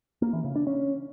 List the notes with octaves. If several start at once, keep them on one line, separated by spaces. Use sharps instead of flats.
A#3
E3
C#3
D4
C#4